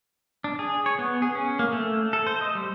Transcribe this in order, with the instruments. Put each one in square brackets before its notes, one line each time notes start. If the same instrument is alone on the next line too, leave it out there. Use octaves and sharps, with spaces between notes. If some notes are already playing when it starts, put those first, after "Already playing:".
[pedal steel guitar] D4
G#4
C#5
B3
G#4
C#4
A#3
A3
A4
C5
D#5
G3